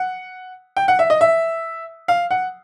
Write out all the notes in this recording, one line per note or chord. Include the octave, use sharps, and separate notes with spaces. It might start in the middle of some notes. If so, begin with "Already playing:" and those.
Already playing: F#5
G5
F#5
E5
D#5
E5
F5
F#5